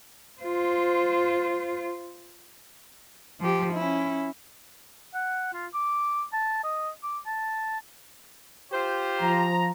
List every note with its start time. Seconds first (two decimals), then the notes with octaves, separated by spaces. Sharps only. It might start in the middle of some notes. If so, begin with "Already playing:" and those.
0.41 F4 C5
3.40 F3 G4
3.73 C#4 E4
5.14 F#5
5.54 F4
5.74 D6
6.33 A5
6.64 D#5
7.03 D6
7.26 A5
8.72 F4 G4 C5
9.21 F3 A#5